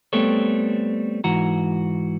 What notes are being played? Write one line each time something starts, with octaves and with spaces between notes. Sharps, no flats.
G3 A3 B3 C4 A4 C#5
G#2 E3 F#4 A#5